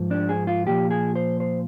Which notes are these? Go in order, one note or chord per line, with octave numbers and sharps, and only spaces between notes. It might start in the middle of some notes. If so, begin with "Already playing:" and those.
Already playing: G#2 F3
D4
G#4
F4
A#2 F3 G4
G#4
C5
C5